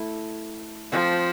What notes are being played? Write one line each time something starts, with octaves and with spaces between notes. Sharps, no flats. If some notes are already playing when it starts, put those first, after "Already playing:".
Already playing: A3 E4
F3 C4 F4 A4 C5